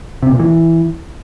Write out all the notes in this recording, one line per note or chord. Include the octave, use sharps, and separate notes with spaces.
C3
A#2
E3